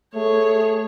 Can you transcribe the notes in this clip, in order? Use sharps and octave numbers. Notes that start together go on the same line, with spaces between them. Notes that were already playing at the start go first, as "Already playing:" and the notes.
A3 G#4 C#5